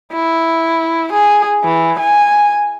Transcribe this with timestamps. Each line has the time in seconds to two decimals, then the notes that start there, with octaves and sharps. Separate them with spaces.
0.13 E4
1.13 G#4
1.64 E3
2.00 G#5